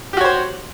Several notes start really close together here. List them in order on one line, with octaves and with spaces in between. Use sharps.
G4 F#4 C#5 C5